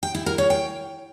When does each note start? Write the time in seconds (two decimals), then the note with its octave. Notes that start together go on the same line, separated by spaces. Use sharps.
0.03 G5
0.15 E4
0.26 A#4
0.38 C#5
0.50 G5